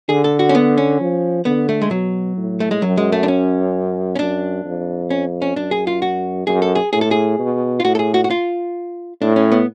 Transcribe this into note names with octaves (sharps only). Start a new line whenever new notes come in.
D3 G#4
A4
F#4
C#4
B3
C#4
F3
D3 B3
A3
G#3
B2 F#3
A2
A3
G#3
F#2 F#3
G#3
A3
D4
C#4
C#4
F#2 D4
F2
C#4
C#4
F#2 D4
G#4
F4
F#4
F#2 G#4
A4
G#4
A2 G#4
A4
G#4
B2
F4
A2 F#4
A4
G#4
F#4
F#4
F4
A2 D4
C#4
B3